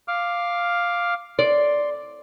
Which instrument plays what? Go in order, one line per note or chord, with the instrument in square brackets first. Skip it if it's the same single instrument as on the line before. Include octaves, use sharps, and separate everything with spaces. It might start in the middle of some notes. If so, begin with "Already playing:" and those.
[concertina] F5 D6 F6
[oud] D5 [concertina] C6